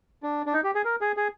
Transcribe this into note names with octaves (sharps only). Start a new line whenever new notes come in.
D4
D4
D#4
G4
G#4
A#4
G#4
G#4